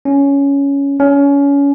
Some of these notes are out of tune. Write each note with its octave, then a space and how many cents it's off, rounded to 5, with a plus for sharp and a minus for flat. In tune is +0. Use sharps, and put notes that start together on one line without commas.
C#4 +10
C#4 +25